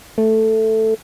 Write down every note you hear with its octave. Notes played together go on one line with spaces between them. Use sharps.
A3